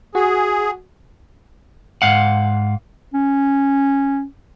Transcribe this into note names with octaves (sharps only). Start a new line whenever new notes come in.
F#4 G#4
G#2 F5 F#5
C#4